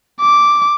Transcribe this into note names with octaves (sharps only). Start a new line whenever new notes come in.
D6